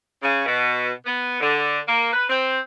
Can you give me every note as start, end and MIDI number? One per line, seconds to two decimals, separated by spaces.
0.22 0.44 49
0.45 0.91 47
1.05 1.39 59
1.40 1.79 50
1.88 2.09 58
2.13 2.25 71
2.29 2.58 60